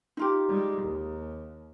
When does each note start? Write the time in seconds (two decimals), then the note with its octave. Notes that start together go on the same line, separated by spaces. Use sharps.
0.17 D#4 F4 G4
0.49 G3 G#3
0.83 D#2